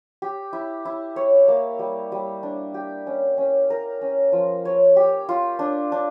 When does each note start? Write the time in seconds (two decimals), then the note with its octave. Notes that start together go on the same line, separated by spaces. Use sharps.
0.22 G4
0.53 E4
0.85 E4
1.16 C#5
1.48 A#3
1.79 G3
2.12 G3
2.43 D4
2.74 G4
3.07 C#4
3.38 C#4
3.70 A#4
4.01 C#4
4.32 F3
4.65 C#5
4.96 G4
5.29 F4
5.59 D4
5.92 D4